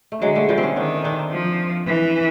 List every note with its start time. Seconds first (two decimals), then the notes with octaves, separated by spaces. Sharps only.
0.12 A3
0.22 D3 F#3 G#3
0.35 G3 A3
0.49 F3 G3
0.58 C4
0.63 B3 C#4
0.76 D#3 C4 D4
1.04 C4 D4
1.32 F3
1.87 E3